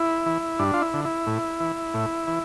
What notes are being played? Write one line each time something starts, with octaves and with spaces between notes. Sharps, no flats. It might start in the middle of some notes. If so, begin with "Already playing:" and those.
Already playing: E4
E3
G2 D4
F4
E4
D3
E4
A2
E3
A2
E3